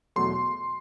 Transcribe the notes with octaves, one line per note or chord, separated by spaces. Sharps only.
E2 B2 F#3 A3 C6